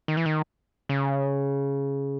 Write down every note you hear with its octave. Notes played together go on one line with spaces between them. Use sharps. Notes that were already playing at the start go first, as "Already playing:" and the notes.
D#3
E3
D#3
C#3